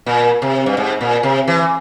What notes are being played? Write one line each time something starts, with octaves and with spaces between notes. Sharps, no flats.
A#2
C3
G2
G#2
A#2
C3
E3